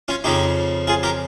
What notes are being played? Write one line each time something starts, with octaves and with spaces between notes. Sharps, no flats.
C#4 F4
F2 C#3 F3 D#4 G4
F4 G#4
G4 A#4